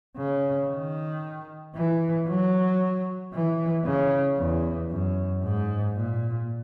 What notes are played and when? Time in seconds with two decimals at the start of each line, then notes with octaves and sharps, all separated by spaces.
0.17 C#3
0.69 D#3
1.75 E3
2.28 F#3
3.33 E3
3.85 C#3
4.38 E2
4.91 F#2
5.44 G#2
5.96 A#2